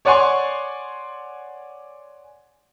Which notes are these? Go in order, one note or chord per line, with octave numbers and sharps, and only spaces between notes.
C#5 D5 F#5 G#5 C6 C#6